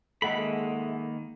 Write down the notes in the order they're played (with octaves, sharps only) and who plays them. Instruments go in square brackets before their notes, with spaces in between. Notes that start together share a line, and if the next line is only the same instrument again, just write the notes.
[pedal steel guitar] D#3 A#3 B5 [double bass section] G#3 [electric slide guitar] A4 E5 F#5